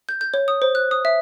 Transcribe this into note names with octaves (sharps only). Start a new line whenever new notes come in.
G6
G6
C#5
D#6
C5
F#6
D#6
E5